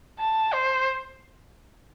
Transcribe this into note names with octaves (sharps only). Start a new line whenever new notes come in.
A5
C5